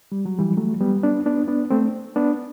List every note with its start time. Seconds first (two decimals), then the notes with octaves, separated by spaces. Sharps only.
0.12 G3
0.26 F#3
0.39 E3 G3
0.57 F#3 A3
0.81 G3 B3
1.03 B3 D4
1.26 B3 D4
1.48 B3 D4
1.71 A3 C4
2.16 B3 D4